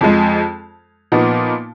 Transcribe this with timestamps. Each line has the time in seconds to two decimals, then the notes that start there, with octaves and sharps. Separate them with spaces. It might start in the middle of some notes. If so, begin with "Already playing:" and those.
0.01 F2 F3 G#3
1.12 A#2 F3 B3 D#4